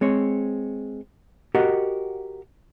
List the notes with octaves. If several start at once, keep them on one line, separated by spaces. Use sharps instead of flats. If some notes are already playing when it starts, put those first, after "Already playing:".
G#3 C4 C#5
F#4 G4 A#4 D#5 F#5